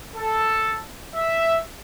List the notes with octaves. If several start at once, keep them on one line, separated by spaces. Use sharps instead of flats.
A4
E5